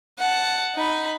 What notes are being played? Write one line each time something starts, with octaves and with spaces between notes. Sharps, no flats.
F#5 A5
D#4 B5